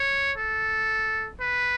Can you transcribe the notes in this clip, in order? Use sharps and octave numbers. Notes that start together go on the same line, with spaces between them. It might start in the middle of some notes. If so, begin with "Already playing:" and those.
Already playing: C#5
A4
B4